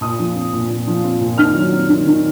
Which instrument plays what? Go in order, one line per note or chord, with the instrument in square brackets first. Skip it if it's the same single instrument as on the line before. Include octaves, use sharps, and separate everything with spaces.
[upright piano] A#2 D#6
F3
C4
A#2
A#2
F3
C4
A#2
D#3 F6
F#3
C4
D#3
D#3